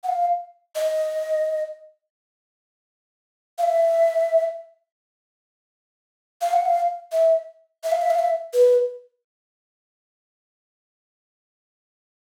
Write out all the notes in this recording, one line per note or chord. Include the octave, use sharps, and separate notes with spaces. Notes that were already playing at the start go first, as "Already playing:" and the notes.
F#5
F5
D#5
F5
E5
F5
F#5
F5
E5
E5
F5
E5
F5
E5
B4